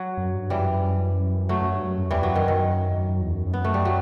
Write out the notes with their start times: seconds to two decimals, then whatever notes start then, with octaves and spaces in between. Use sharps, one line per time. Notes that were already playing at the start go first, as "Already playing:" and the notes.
Already playing: F#3
0.18 F#2
0.34 G2
0.50 F#2 E3 G3
1.49 F#3 A3
1.62 F#2
1.74 G2
1.86 F#2
1.98 F#2
2.09 E2 E3 G3
2.22 F#2 F#3
2.35 D#3
2.48 D#3
2.97 F#2
3.09 F#2
3.22 E2
3.34 F#2
3.47 F#2
3.53 B3
3.64 A3
3.74 G3
3.85 F#3